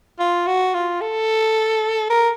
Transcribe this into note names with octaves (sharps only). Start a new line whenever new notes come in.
F4
F#4
F4
A4
A#4